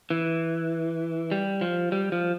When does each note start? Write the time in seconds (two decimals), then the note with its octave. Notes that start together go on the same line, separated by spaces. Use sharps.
0.10 E3
1.32 G3
1.61 F3
1.92 G3
2.12 F3